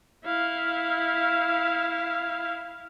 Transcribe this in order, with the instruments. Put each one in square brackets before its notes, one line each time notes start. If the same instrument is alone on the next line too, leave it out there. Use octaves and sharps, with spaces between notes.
[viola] E4 F5